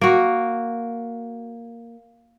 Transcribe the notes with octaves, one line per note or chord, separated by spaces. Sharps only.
A#3 F#4